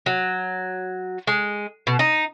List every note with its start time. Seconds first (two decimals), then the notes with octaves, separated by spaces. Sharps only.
0.06 F#3
1.27 G#3
1.87 B2
1.99 D#4